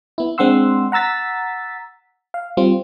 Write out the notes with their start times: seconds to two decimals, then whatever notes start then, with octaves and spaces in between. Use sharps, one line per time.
0.18 B3 E4
0.38 G#3 C4 D4 F#5 C6 E6
0.92 F#5 A#5 E6 A6 B6
2.34 F5
2.57 G3 C4 F4